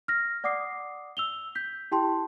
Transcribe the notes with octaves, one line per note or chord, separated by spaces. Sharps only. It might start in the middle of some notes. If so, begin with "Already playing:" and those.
F6 A#6
D5 F#5 D6 D#6 C7
E6 F7 G7
G6 B6
E4 G4 G5 A5 C6